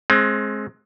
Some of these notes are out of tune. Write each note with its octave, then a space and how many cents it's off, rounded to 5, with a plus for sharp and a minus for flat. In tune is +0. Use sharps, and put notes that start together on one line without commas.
G#3 +20 C4 +25